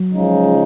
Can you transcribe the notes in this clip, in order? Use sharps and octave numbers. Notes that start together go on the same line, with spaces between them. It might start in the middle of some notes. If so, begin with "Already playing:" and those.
Already playing: F#3
C#2 C#3 F3 G#3 D#4